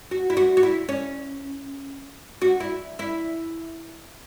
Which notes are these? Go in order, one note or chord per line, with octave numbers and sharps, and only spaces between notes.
F#4
E4
F#4
F#4
E4
C#4
F#4
E4
E4